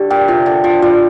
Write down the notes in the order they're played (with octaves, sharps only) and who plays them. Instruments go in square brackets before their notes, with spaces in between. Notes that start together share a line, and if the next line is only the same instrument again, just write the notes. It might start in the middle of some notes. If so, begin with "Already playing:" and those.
Already playing: [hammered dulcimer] D3 [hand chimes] G4
[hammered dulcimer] A#2 [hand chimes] G5
[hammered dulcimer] C3 [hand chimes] F4
[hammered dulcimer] D3 [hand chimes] G5
[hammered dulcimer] F3 [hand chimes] F4
[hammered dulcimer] G3 [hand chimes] F4